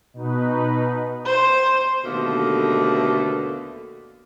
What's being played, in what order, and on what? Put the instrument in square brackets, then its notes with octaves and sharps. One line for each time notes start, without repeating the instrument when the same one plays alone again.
[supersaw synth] B2 D#4 B4
[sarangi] C5
[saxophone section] D#2 B2 D3 D#3 A3 A#3